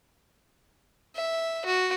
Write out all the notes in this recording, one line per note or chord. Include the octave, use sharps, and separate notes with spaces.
E5
F#4